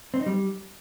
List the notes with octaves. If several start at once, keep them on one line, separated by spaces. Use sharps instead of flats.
C4
D#4
G3